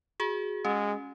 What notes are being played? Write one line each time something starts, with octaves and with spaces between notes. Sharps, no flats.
F#4 G#4
G#3 C#4